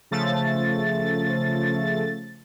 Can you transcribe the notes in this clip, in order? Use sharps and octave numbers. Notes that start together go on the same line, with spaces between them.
C#3 F3 A3 A6